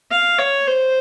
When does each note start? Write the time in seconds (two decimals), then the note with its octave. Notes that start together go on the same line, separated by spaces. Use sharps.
0.11 F5
0.38 C#5
0.67 C5